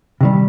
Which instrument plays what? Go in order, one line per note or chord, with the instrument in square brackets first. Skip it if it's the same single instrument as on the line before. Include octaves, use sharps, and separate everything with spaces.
[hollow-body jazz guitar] C3 D#3 G3